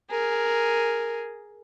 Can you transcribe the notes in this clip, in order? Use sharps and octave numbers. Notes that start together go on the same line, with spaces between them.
G#4 A#4